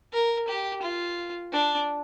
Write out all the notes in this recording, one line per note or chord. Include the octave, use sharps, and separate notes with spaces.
A#4
G4
F4
D4